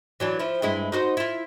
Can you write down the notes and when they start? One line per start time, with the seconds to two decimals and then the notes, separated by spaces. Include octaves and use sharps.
0.20 E3 F#3 D4
0.40 F3 E4
0.62 G2 G#3 E4
0.92 D#4 F#4 C5
1.17 E4 F4